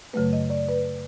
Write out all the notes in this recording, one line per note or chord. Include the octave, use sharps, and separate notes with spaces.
F#2 C#3 F#3 A3 B4
D#5
D5
B4